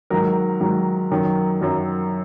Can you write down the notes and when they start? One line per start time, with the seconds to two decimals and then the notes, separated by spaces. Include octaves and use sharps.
0.10 G#2 D#3 F#3 A#4
0.60 G#2 D#3 F#3
1.11 F#2 D#3 F#3
1.61 F#2 D#3 F#3 A#4